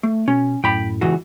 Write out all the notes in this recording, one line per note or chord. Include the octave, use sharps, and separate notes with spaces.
A3
B2 C#4
F#2 A2 G5 B5
C#2 E3 F#4